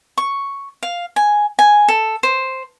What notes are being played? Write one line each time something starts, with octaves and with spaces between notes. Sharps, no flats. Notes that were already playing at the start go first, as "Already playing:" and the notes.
C#6
F5
G#5
G#5
A4
C5